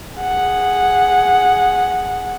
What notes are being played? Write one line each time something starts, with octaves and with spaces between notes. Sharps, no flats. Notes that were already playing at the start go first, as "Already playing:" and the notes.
G#4 F#5